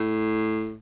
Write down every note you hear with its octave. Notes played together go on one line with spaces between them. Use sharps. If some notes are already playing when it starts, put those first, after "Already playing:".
Already playing: A2